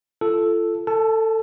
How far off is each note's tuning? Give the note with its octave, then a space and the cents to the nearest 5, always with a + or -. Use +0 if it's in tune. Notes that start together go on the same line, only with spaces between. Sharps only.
F4 -30 A4 +0
A4 +20 A5 -25